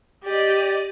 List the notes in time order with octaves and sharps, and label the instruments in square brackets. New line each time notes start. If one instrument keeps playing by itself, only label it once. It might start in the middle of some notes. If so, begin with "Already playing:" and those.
[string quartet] G4 D5 D#5